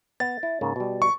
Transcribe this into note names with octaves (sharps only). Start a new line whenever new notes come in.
B3 A6
E4
G#2 C#3 A#3
B2 G3
C#6